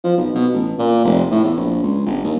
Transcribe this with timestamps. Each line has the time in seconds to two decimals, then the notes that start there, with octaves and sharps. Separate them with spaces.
0.04 F3
0.17 B1
0.35 B2
0.54 A1
0.79 A#2
1.05 F1
1.31 A2
1.45 E2
1.56 A#1
1.83 C#2
2.06 G1
2.25 D#2